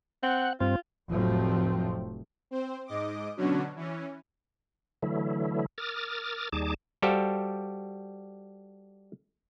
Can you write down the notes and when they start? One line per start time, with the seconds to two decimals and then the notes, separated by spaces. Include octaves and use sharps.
0.23 C4 F#5
0.60 G2 C4 F4
1.09 F1 A2 F3 F#3 A3 C4
2.51 C4 C5
2.86 G#2 D#5 D6
3.37 B2 D3 F#3 C#4 D4 F#4
3.76 E3 C#4
5.03 D3 E3 F#3 A3 E4
5.78 A#4 D6 D#6 F6 A6
6.52 D#2 G3 D#4 G#4 A5 D6
7.02 G3 F#4 G4 A4 C5 F5